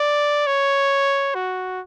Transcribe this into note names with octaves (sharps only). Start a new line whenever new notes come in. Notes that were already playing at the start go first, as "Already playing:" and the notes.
Already playing: D5
C#5
F#4